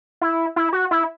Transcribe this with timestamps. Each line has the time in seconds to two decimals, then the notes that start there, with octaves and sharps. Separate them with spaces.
0.21 E4
0.56 E4
0.73 F#4
0.91 E4